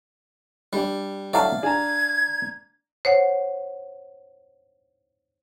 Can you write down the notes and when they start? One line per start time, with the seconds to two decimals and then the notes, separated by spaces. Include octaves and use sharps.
0.73 G3 D4 D5
1.33 F#3 A3 D4 E4 D5 F5
1.63 D4 G#4 A5 A#5 G#6
3.05 C5 C#5 F#5